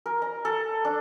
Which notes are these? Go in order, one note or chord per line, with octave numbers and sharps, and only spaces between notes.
A#4
A#5
A4
D4